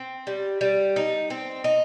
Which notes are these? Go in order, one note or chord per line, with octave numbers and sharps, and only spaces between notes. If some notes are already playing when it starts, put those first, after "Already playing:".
Already playing: C4
G3
G3
D#4
C4
D#4